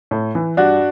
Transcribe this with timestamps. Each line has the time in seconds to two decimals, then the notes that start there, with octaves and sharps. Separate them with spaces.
0.11 A2
0.35 E3
0.57 G2 D4 F#4